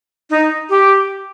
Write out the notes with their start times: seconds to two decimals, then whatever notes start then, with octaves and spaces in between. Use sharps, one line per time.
0.30 D#4
0.70 G4